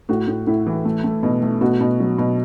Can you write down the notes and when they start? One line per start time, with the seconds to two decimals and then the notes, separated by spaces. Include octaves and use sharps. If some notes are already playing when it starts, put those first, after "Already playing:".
0.09 A2 F#4
0.28 A2
0.47 A2 E4
0.66 E3
0.85 A3
1.04 A3
1.23 B2
1.43 A3
1.61 B2 F#4
1.81 B2
2.00 F#3
2.18 B2